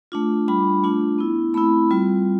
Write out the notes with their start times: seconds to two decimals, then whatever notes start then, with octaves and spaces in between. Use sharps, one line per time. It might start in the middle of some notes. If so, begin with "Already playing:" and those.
0.12 A3 D4 F4
0.48 G3 D4 F4 B5
0.84 A3 D4 F4
1.18 B3 E4
1.54 A3 C4 E4 B5
1.91 G3 C4 F4